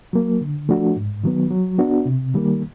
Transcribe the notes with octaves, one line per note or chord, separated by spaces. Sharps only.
F#3 A#3
D3
F3 A3 D4 F#4
G#2
D#3 F#3 B3
F#3
B3 D4 F#4
C3
D#3 G3 A#3